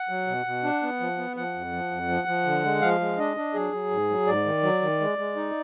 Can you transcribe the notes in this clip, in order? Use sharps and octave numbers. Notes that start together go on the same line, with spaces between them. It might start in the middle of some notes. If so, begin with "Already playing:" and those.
Already playing: F#5
F#3
B2
B2
D4
B3
F3
B3
F3 F#5
F2
F3
F2
F3
F3
D3
G#3
F3 F5
G#3
D4 D#5
D4
F#3 G#4
F#3
G#2
F#3
G#2 D5
D#3
F#3
D#3
G#3
G#3
D#4